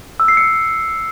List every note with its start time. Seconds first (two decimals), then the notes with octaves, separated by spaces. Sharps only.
0.20 E6
0.28 C7
0.37 C#7